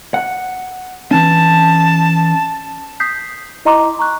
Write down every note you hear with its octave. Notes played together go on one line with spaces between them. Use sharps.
F#5
E3 C#4 A5
D#6 G6 B6 C7
E4 D#5 A#5 C6 D6
A#5 C#6 F#6